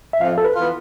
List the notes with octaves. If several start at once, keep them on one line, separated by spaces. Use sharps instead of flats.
E5
F2 F5
A4
B4
E3 B3 F4